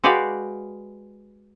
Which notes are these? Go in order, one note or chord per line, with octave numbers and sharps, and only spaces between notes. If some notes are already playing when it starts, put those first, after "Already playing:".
G#3 F#4 G4 B4 D5 F5